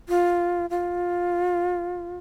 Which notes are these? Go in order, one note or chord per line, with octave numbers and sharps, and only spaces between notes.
F4
F4